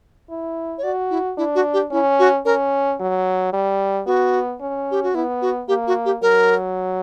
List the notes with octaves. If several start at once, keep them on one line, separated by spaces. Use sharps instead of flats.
E4
C#5
F#4 D5
E4
D4 E4
F#4
G4
C#4 E4
F#4
C#4 A#4
F#3
G3
B3 F#4
C#4
G4
F#4
B3 E4
F#4
A#3 G4
F#4
G4
F#3 A#4